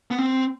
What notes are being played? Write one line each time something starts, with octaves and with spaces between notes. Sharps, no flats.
B3
C4